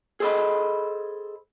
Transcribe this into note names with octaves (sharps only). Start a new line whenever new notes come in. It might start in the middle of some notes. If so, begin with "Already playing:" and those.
G#4 A4 C5 D5 D#5 B5